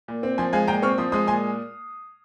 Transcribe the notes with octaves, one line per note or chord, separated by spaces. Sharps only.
A#2
C4
F3 G#5 C6
G#3 F5 G#5
A#2 G5 A#5
C4 C#6 F6
F3 C6 D#6
G#3 C6 D#6
A#2 G#5 C6